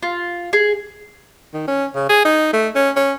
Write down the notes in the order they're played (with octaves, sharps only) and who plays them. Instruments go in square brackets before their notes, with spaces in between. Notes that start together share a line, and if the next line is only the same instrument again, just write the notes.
[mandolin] F4
G#4
[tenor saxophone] D#3
C#4
C#3
G#4
D#4
A3
C#4
C#4